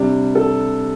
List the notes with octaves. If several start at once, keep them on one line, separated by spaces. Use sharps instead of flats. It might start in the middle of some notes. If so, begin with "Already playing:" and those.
Already playing: C3 G3 D4
A4